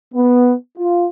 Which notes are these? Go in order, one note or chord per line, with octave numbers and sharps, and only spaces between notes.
B3
F4